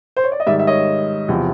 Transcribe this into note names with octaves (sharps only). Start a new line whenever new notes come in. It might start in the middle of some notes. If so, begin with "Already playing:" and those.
C5
C#5
D5
D#5
G#2 D#3 G3 D5 E5
E5
C#5 D#5
E2 C3 F3